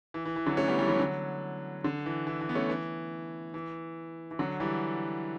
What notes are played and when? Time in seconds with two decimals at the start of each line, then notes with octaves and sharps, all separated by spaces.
0.14 E3
0.25 E3
0.36 E3
0.46 D3 F#3
0.57 A3 C#4
0.68 G3 B3
0.78 E3 G3
0.89 D3 F#3
0.99 D3 F#3
1.84 D3
2.06 E3
2.27 E3
2.41 E3
2.49 B3
2.55 A3 C#4
2.69 E3
3.54 E3
4.31 E3
4.39 D3 F#3
4.60 E3 G3